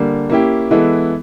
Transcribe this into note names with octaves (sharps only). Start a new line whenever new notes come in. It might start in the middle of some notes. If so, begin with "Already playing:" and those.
Already playing: D3 G3 A#3
A#3 C#4 E4 G4
E3 G#3 B3 E4 A4